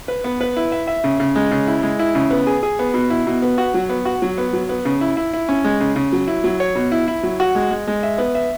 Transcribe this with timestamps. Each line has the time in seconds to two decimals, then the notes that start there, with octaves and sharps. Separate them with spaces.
0.08 B4
0.24 B3
0.41 B4
0.57 E4
0.72 E5
0.87 E5
1.04 C#3
1.20 C#3
1.36 G#3
1.51 C#3
1.67 E4
1.83 G#3
1.99 E4
2.15 C#3
2.31 B3
2.47 G#4
2.63 G#4
2.79 B3
2.94 B2
3.10 E4
3.27 B2
3.42 B3
3.58 F#4
3.74 F#3
3.89 B3
4.05 F#4
4.22 F#3
4.38 B3
4.53 F#3
4.69 B3
4.85 C#3
5.01 E4
5.17 E4
5.33 E4
5.49 C#4
5.64 G#3
5.80 C#3
5.96 C#3
6.12 F#3
6.27 E4
6.44 F#3
6.60 C#5
6.75 B2
6.92 E4
7.08 E4
7.23 F#3
7.40 F#4
7.55 G#3
7.71 G#3
7.87 G#3
8.03 E5
8.18 B3
8.35 E5